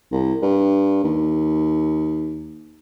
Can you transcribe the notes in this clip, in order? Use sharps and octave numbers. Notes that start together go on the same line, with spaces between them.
C2
G2
D#2